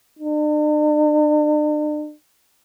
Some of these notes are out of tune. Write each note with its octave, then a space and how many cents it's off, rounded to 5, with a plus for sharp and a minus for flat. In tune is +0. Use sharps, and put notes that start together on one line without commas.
D4 +45